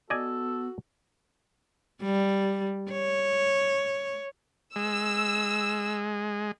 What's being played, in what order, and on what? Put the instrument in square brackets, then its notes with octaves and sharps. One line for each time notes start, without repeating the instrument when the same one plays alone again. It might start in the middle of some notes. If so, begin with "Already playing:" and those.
[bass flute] B3 [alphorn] F#4 [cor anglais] A4 [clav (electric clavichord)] D5 D#5 G#5
[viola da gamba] G3
C#5
[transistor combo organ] G#3 [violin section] E6